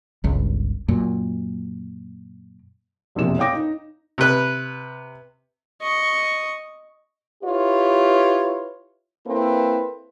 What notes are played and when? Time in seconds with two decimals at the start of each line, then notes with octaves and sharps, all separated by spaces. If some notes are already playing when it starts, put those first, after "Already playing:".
0.24 G1 C#2
0.88 F#2 A#2
3.15 E1 A#1 F2 C3 E7
3.38 C#5 F5 G5 D6 A#6
3.53 D#4
4.18 C3 B4
5.82 D#5 C#6
7.44 E4 F4 G4 B4 C#5
9.27 A#3 C4 E4 A4 B4